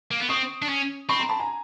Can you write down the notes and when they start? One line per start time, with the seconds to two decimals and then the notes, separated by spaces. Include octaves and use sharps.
0.11 A#3
0.20 B3
0.29 C4 C#6 D#6
0.62 D4
0.69 C#4
1.09 C4 B5 C#6
1.19 A#5 C6
1.29 A5 B5
1.40 G#5 A#5